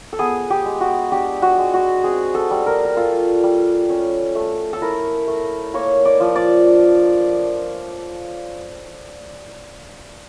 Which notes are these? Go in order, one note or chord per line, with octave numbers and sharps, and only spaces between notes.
A4
B3 G#4
G4
G#3
F#4
D4 G4
F#4
G#3
F#4
C4 G#4
A4
G3
A#4
A#4
F4 A4
G3
C#4
A3
A4
E4 A#4
A3
A#3 C#5
D5
F3
D5
D4